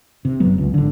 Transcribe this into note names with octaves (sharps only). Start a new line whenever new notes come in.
C3
F#1 F#3 B3
C#2
G#1 D3